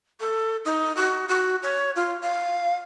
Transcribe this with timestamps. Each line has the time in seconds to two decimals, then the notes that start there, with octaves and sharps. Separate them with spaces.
0.20 A4
0.65 D#4
0.96 F#4
1.28 F#4
1.63 C#5
1.96 F4
2.23 F5